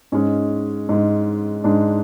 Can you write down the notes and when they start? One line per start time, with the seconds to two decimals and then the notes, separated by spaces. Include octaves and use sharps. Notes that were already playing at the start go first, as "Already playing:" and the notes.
0.12 G#2 G#3 C#4
0.89 G#2 G#3
1.64 G#2 G#3 D4